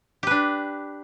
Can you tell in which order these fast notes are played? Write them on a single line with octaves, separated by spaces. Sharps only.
G4 B4 D4